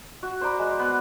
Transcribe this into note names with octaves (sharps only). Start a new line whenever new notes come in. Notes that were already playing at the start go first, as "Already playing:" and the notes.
F#4
C5 D5 A#5 B5
G#3
B3